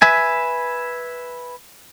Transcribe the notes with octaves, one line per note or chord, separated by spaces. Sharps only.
B4 E5 G#5